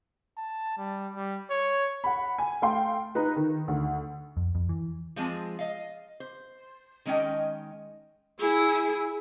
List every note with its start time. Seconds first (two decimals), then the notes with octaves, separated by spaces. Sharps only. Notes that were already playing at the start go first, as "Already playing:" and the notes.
0.38 A5
0.78 G3
1.13 G3
1.50 C#5
2.04 F#5 B5
2.38 G#5
2.62 A3 F5 G5 C6
3.15 D#4 B4
3.36 D#3
3.68 D2
4.37 F2
4.55 F2
4.69 E3
5.16 F3 G#3 C4
5.59 D#5 F5
6.20 C5
7.06 D#3 G#3 C#4 D#5 G5
8.40 E4 G#4